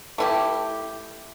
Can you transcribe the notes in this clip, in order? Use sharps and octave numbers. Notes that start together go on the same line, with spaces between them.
A3 E4 G4